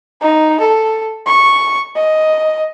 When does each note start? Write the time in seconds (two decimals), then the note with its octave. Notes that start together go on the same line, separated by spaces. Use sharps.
0.21 D#4
0.60 A4
1.26 C#6
1.95 D#5